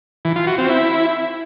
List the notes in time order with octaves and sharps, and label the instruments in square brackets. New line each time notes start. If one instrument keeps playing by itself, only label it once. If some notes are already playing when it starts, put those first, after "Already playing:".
[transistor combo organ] E3
F4
F#4
C4
E4